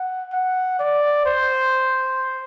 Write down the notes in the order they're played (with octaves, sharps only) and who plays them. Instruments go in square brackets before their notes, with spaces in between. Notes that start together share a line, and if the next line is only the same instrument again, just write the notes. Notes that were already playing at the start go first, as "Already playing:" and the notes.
Already playing: [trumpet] F#5
F#5
D5
C5